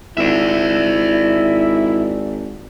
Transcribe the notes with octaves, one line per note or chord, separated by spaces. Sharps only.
G#1 E4 D5 E5